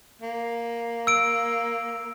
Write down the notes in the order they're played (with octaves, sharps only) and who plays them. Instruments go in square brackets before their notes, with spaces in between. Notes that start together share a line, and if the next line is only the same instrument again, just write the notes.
[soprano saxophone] A#3
[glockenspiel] E6 D7